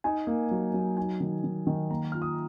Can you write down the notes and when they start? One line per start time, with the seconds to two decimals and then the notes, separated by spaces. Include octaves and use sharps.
0.04 D#4 G#5
0.27 A#3
0.51 F#3
0.74 F#3
0.97 D#4 G#5
1.20 D#3
1.44 D#3
1.67 D#3
1.90 A#3 A#5
2.12 F4 F6
2.22 D#6